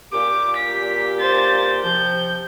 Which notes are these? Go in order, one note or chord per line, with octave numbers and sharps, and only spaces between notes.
A#2 G4 D6
B6
C5 A6
C3 F3 G6